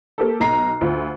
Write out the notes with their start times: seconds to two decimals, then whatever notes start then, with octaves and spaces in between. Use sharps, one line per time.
0.18 A#3 G4 A4
0.40 B1 A#5 C7
0.81 D2 F4